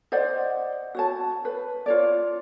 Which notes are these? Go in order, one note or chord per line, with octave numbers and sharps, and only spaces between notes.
C5 D5 D#5 F#5
F#4 C#5 A5
B4
F4 C#5 D5